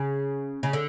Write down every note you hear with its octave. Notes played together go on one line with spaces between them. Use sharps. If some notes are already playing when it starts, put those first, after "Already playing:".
Already playing: C#3
C#3
D3